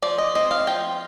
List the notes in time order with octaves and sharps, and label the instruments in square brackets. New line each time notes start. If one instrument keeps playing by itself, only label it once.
[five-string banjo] F3 D5
D#5
C4 D#5
F5
F3 G5